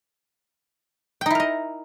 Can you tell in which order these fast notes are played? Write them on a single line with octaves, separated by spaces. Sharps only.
G5 D#4 E4 A#4 D#5